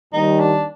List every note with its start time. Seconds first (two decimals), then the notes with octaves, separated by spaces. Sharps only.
0.13 D#2 D#3 G3 D#4
0.40 D4